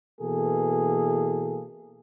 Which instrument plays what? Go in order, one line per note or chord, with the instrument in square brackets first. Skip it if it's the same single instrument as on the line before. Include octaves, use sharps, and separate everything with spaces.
[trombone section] B2 E3 A#3 G#4 A4